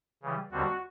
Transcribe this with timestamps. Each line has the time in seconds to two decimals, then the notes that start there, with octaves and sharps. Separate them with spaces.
0.23 C#3 E3 G3
0.51 D#2 D3 G3 C4 F#4